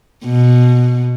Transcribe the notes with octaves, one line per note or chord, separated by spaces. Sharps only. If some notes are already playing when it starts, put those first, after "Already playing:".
B2